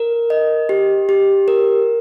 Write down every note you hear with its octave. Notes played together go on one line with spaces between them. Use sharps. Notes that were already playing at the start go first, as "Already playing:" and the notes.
Already playing: A#4
D#5
G4
G4
A#4